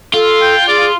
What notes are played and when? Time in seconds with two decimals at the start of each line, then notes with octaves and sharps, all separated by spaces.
0.14 F4 A4
0.42 G5
0.68 G#4 D5